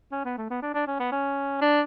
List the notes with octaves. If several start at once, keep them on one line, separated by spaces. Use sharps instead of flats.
C#4
B3
A3
B3
D4
D4
C#4
B3
C#4
D4